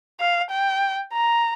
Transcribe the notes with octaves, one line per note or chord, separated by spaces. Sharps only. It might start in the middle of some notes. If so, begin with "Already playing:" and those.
F5
G5
A#5